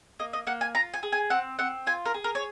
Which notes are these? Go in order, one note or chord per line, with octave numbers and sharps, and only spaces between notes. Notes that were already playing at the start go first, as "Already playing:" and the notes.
A#3 D#5
D#5
A#3 F#5
G#5
F4 A#5
G#5
G#4
G#5
C4 F#5
C4 F#5
F4 G#5
A#4
G#4
A#4
C#5